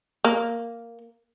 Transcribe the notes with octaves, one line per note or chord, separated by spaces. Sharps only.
A#3